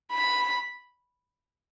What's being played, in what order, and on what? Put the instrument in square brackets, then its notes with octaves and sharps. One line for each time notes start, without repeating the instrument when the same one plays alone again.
[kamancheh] B5